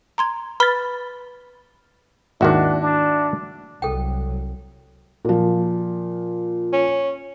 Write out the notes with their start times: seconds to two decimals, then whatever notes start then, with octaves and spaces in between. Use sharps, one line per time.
0.18 A#5 C6 G#6
0.60 B4 B5 F6 A6 G7
2.41 G#1 D#2 D#3 D4 E4 F#4
2.82 D4
3.82 C2 F#3 A4 G5
5.25 A#2 F3
6.73 C#4